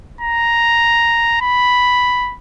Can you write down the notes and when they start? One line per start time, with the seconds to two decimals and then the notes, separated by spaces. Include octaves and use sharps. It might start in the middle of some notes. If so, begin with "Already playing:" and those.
0.21 A#5
1.41 B5